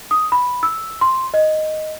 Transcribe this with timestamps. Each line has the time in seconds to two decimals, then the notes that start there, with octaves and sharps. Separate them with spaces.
0.11 D#6
0.32 B5
0.63 E6
1.01 C6
1.34 D#5